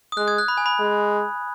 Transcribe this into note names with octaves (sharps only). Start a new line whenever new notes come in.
D#6
G#3 F#6
D#6 G#6
F#6
B5
G#5
B5
G#3